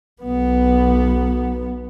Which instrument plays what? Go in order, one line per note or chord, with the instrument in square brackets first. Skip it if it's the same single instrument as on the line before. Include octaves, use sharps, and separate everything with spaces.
[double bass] B1 B3